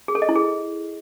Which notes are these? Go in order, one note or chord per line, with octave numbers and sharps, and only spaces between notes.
G#4
A4
D#5
E4
G#4